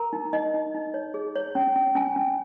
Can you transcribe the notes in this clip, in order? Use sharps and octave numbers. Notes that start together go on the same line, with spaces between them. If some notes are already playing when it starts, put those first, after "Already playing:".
Already playing: A#4 A#5
D#4
D#4 D#5
D#4
D#4
C#5
G#4
C#5
C#4
C#4
C#4 G#5
C#4